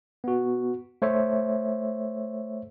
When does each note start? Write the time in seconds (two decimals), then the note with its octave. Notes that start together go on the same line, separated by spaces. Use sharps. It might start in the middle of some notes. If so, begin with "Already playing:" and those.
0.24 B3 F#4
1.02 A3 C5 C#5 E5